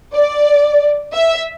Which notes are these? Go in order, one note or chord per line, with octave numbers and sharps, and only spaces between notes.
D5
E5